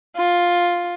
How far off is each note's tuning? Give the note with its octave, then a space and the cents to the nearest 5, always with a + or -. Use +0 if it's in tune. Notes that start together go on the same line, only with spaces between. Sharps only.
F4 +5